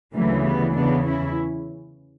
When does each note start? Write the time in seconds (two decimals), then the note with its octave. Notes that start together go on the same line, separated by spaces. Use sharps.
0.14 D2 C#3 E3 F#3 A#3
0.44 G3 B3
0.75 E2 C#3 E3 B3 D4
1.06 C#4 E4